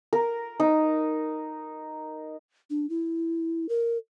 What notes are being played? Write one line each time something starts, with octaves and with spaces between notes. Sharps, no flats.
A#4
D#4
D4
E4
A#4